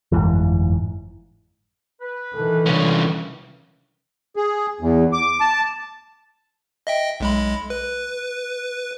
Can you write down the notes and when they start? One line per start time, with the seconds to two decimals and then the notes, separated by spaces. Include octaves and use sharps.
0.12 G1 F2 G#2 E3
2.02 B4
2.35 D#3 E3 A4
2.66 C2 D3 C#4
4.36 G#4
4.81 E2
5.13 D6
5.41 A5
6.87 D#5 E5 G5
7.20 B1 G#3 B5
7.70 B4